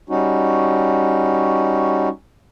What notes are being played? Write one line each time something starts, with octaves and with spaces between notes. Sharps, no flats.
G3 C#4 D#4 F#4